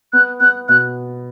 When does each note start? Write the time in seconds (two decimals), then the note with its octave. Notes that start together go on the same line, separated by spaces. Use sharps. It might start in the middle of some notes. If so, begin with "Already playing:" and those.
0.13 B3 F#6
0.40 B3 F#6
0.69 B2 F#6